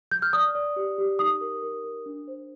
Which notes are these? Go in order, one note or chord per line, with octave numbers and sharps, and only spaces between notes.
G6
F6
D5 D#6
D5
G4
G4
D#4 D#6
A#4
A#4
A#4
D4
C5